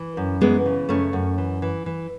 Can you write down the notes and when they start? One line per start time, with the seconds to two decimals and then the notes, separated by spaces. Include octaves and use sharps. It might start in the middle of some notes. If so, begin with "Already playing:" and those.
Already playing: E3
0.17 F#2
0.41 E3 G#3 B3
0.66 C#3
0.89 F#2 A3 C#4
1.13 F#2
1.38 E3
1.62 E3
1.86 E3